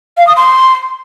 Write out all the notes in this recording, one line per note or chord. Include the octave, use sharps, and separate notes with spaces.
F5
D#6
C6